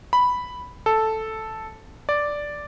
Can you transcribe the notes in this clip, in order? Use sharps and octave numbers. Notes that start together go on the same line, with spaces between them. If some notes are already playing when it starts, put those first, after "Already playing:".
B5
A4
D5